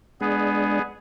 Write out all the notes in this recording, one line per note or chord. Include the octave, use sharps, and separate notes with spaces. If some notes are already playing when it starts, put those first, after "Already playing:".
G#3 B3 D4 G#4